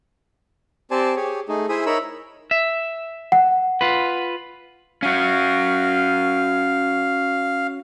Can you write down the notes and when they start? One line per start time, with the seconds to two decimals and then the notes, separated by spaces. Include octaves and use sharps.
0.91 C4 G4 C5 D5 G#5 A5
1.16 G4 G#4 C#5
1.49 A3 D#4 G#4
1.69 E4 G#4 C5 E5 G#5 D#6
1.86 D#4 A#4 C#5 E5 B5 E6
2.51 E5
3.32 F#5
3.81 F4 B4
5.03 C#4 F#4 F5